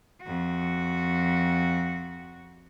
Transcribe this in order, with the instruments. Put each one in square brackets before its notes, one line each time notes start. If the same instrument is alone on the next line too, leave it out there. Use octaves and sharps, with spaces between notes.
[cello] F2 F#4